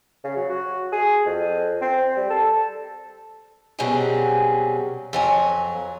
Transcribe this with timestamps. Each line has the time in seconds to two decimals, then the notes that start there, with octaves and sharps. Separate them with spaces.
0.24 C#3
0.36 F#3
0.49 F#4
0.93 G#4
1.26 F2
1.81 C4
2.17 G3
2.30 A4
3.79 B2 F#3 G3 C4 C#4 G#4
5.13 F2 F#3 G#5